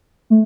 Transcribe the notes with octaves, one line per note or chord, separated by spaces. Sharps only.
A3